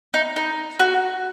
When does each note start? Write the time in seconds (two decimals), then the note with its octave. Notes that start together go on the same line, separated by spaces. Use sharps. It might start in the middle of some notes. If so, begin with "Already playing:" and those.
0.14 D#4
0.36 D#4
0.79 F#4